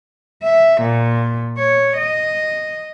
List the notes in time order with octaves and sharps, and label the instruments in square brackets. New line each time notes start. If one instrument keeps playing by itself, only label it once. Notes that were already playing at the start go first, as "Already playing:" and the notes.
[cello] E5
A#2
C#5
D#5